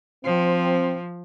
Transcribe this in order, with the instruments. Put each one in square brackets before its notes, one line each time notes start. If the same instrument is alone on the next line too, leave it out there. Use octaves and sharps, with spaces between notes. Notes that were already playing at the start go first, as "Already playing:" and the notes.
[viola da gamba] F3 [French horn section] C4